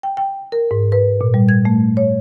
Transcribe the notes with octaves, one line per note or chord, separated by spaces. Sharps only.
G5
G5
A#4
G#2
B4
A#2
G3
G#6
A3
C#5